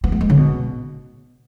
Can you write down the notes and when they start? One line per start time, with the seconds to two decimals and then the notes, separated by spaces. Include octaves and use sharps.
0.04 B3
0.12 A3
0.21 G#3
0.30 C#3
0.37 B2